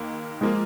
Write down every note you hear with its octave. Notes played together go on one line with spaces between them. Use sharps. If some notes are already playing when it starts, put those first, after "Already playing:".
Already playing: D#2 D#3 A#3
F3 G#3 A#3 F4